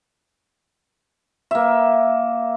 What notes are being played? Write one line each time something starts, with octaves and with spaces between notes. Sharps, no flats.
A#3 E5